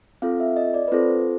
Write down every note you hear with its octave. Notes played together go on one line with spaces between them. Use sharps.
C4 F4 A4 F5
E5
D#5
D5
B4
C4 F4 A4 C5